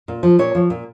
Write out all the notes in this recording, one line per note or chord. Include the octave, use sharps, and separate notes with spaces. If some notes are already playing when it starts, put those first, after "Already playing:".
A#2
F3
A#2 C#5
F3
A#2